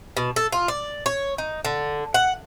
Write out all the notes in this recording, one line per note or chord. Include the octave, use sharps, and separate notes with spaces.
B2
A4
F4
D5
C#5
D#4
D3
F#5